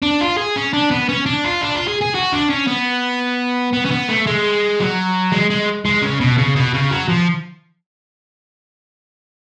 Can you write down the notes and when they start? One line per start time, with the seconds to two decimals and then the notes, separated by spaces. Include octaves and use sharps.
0.02 D4
0.21 F4
0.37 G#4
0.56 C#4
0.73 D4
0.91 B3
1.09 C#4
1.26 D4
1.44 F4
1.61 D4
1.75 F4
1.87 G#4
2.01 G#4
2.15 F#4
2.33 D4
2.50 C#4
2.67 B3
3.73 B3
3.86 C#4
3.91 B3
4.09 A3
4.27 G#3
4.80 F#3
5.32 G#3
5.50 G#3
5.85 G#3
6.02 C#3
6.20 B2
6.38 C#3
6.56 B2
6.73 C#3
6.91 F#3
7.08 F3